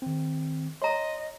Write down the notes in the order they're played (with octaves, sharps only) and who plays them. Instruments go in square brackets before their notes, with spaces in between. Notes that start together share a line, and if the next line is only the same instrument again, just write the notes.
[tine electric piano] D#3 C4
[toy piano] C#5 A#5 [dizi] D#5 [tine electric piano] C6